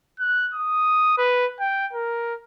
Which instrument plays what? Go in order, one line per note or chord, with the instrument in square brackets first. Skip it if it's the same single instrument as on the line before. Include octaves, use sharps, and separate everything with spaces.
[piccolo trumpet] F#6
D#6
B4
G5
A#4